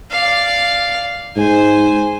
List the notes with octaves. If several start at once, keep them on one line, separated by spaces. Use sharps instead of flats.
D5 F5
G#2 C5 G#5